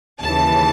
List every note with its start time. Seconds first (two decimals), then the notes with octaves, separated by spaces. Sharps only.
0.21 D#2 C#3 E3 A5